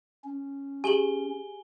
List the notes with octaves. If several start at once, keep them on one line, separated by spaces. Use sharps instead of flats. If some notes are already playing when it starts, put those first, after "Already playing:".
C#4
G4 G#4 G#5 F#7 G7